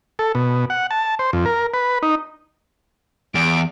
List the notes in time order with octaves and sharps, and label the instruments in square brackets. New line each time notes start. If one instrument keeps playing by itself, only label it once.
[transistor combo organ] A4
B2
F#5
A5
C5
F2
A#4
B4
D#4
[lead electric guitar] E2 [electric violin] D7